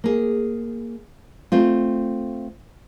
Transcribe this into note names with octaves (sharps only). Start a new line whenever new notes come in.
A#3 G#4
A3 C4 F4